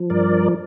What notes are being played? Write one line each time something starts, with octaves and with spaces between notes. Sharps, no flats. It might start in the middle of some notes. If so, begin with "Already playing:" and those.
Already playing: F3
G2 A#4 D5